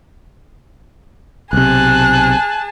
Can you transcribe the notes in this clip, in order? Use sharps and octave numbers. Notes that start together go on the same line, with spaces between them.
B1 C3 G#4 A5 F#6